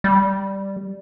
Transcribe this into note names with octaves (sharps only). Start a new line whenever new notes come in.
G3